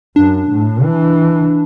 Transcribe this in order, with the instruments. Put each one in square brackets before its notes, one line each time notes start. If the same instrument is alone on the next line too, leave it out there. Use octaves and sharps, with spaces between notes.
[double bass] F#2 [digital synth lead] D4
[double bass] A2
E3